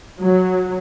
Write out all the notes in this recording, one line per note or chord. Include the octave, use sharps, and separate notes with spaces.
F#3